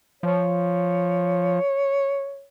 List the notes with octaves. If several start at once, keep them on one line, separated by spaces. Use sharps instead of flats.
F3 C#5